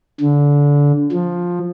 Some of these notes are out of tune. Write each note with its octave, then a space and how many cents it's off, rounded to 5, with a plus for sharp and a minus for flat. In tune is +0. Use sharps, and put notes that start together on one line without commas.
D3 -25
F3 +10